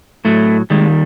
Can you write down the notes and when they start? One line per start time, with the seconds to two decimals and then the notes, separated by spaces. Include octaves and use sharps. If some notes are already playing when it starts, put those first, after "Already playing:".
0.25 A2 F#3 A3
0.70 D#2 D#3 G3 G#3